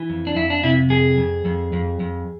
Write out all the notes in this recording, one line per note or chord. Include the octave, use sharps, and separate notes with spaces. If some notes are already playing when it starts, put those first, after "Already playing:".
Already playing: E3
F2
D4
F2 E4
D4
C3 E4
F2 G#4
F2
F2
F2
F2